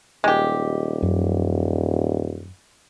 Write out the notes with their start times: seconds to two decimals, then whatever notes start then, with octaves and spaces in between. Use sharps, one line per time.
0.24 D#1 G#3 G4
1.02 F#2 F#3